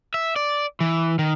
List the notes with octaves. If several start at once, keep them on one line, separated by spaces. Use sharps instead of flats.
E5
D5
E3
D#3